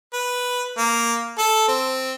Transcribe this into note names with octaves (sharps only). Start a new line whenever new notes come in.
B4
A#3
A4
C4